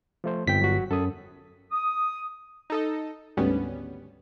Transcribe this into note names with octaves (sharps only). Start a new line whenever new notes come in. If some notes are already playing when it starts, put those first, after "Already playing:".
F3 A3 C5
G1 F2 C4 G5 B6
F#3 F#4
F#2 A4 D#6
D#6
D#4 A4 D#5
G#1 D2 G3 B3 C#4